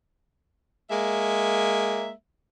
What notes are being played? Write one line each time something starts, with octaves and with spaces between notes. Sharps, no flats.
G#3 A#3 E5